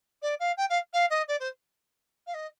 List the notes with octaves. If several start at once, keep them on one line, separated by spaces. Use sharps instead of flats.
D5
F5
G5
F5
F5
D#5
D5
C5
F5
D#5